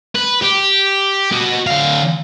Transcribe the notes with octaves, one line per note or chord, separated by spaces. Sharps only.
B4
G4
F#4 D#5
D3 F5